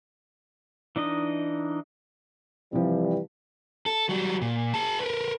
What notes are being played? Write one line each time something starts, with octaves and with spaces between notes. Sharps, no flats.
E3 D4 D#4 D#5
C3 E3 F3 G3
A4
F#3 G3
A#2
G#4 A5
A#4 B4